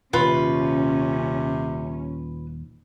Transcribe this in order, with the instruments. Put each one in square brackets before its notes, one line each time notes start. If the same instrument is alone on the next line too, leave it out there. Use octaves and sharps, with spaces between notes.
[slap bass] D#1 [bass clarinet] C3 [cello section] C#4 [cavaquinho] F4 B4